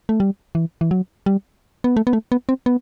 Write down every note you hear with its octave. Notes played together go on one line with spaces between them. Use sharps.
A3
G3
E3
E3
F#3
G3
B3
A3
B3
A3
B3
C4
B3